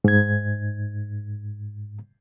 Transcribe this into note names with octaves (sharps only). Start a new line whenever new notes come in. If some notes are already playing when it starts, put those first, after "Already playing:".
G#2 G#6